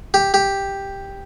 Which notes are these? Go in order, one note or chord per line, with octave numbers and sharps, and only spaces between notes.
G4
G4